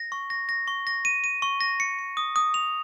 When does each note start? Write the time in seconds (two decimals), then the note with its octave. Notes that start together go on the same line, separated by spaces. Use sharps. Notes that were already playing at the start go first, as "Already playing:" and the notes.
Already playing: A#6
0.12 C#6
0.30 A#6
0.49 A#6
0.68 C#6
0.87 A#6
1.05 D#7
1.24 D#7
1.42 C#6
1.61 A#6
1.80 C#7
1.99 C#7
2.17 D#6
2.36 D#6
2.54 F7